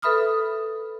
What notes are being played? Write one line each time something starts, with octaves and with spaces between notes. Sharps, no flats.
A4 B4 E5 B5 D#6 F6